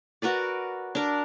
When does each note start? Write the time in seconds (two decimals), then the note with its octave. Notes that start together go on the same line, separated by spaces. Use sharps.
0.22 F#4 A#4 B4 D5
0.95 D4 A#4